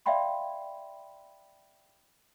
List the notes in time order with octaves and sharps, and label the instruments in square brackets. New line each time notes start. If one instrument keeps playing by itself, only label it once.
[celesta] D5 E5 F5 G5 B5 C6